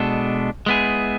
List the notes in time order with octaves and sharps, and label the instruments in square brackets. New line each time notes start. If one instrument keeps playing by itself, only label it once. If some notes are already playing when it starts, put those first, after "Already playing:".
Already playing: [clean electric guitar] B2 G#3 B3 D4 A4
G#3 B3 E4 G#4